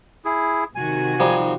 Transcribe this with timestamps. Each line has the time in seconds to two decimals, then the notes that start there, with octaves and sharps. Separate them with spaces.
0.25 E4 G#4
0.75 C3 D#3 F#4 G#5
1.20 F3 G3 D#4